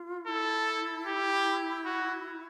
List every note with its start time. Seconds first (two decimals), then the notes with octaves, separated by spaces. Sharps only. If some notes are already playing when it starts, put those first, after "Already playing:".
Already playing: F4
0.27 E4 A4
1.06 G4
1.85 F#4